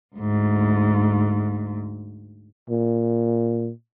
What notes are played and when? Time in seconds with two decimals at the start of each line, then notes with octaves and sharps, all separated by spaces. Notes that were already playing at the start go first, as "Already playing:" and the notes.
0.16 D2 G#2
2.69 A#2